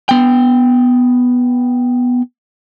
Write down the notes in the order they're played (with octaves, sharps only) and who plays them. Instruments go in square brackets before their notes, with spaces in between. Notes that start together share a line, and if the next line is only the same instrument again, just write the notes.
[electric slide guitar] B3 G5